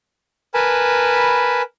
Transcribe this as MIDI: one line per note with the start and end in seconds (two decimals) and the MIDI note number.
0.54 1.62 70
0.54 1.62 71
0.54 1.62 80
0.54 1.62 81
0.54 1.62 83